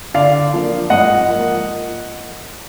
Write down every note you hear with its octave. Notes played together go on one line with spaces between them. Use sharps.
D3 D5 F5
F3 A#3 D4
G#2 D#5 F#5
F3 A#3